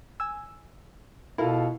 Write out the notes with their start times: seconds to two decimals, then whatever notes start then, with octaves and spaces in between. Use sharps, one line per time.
0.20 G#5 E6
1.38 B2 E4 F4 A4 A#4 F5